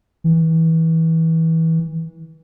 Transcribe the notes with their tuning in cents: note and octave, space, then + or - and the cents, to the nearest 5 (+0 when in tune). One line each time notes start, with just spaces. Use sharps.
E3 -25